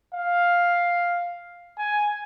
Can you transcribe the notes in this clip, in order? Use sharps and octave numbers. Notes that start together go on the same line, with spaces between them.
F5
G#5